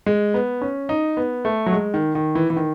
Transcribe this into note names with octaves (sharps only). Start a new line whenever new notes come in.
G#3
B3
C#4
D#4
B3
A3
F#3
G#3
D#3
D#3
E3
E3
D#3